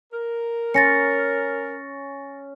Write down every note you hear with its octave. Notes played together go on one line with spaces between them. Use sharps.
A#4
C#4 A6 A#6 C#7